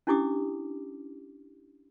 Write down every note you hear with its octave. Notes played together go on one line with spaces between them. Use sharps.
C#4 D4 E4 G4 D6 D#6